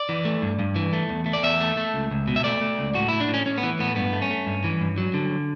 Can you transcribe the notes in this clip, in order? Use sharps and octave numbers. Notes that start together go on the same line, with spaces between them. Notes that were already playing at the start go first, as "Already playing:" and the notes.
Already playing: D5
E3
A3
G2
G2
E3
A3
E2
A3
D5
E2 E5
A3
A3
C#2
C#2
B2
E5
A3 D5
A3
C#2
A2 F#4
A2 E4
D4
A2
C#4
A2 C#4
B3
E3
A2 B3
G2 B3
A3
C#4
A3
G2
E3
G2
F#3
D3